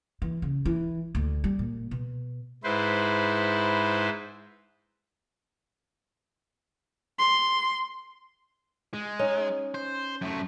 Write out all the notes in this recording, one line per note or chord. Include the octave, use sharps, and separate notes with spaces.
E3
C#3
E3
D2
G3
A#2
B2
G#2 E4 B4 C5
C6
G#3
C#4 D#4
C5
F#2 A3